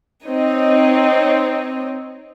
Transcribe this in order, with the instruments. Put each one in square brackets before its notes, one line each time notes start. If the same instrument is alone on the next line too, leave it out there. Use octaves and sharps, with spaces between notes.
[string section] C4 D#4 C#5 D#5